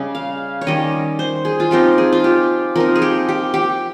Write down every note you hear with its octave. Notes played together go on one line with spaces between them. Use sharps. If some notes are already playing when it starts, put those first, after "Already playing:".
Already playing: C#3 G3 C#4 D#5
F5
C#5
D#3 G3 C#4 D#5
C5
G#4
F4
F3 C4 D#4 G4
G#4
F4
G4
F3 C4 D#4 A#4
G#4
G4
G4
G4